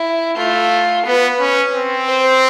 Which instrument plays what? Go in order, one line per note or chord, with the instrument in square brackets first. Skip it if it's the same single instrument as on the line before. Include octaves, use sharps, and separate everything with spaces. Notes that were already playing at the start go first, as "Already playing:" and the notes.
Already playing: [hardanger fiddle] E4
[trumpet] A3 [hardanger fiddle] F4
[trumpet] B3 [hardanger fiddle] B4
[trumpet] C#4
C4
[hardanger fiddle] C5